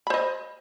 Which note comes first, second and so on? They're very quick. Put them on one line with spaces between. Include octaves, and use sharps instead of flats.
B5 C5 D#5